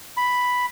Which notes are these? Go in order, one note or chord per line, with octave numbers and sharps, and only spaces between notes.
B5